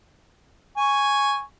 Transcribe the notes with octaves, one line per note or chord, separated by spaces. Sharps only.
G#5 C#6